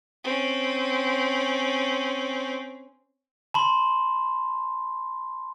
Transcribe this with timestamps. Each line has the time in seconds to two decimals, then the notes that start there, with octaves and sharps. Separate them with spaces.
0.25 C4 C#4
3.54 A5 B5 C6